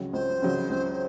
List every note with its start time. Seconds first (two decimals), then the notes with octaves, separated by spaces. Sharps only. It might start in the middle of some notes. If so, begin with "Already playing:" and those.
Already playing: C#2 C#3 F#3
0.13 C#2 C5
0.42 C#3 F#3
0.69 C#2